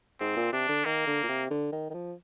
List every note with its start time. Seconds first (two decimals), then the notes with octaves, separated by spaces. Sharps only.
0.20 G#2 C4
0.36 A#2
0.52 C3 D4
0.69 D3
0.85 D#3 A#3
1.07 D3
1.23 A#2
1.28 C3
1.50 D3
1.72 D#3
1.90 D#3
1.93 F3